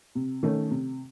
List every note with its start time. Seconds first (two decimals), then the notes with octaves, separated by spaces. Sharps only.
0.15 C3
0.43 D#3 A3 C#4
0.71 C3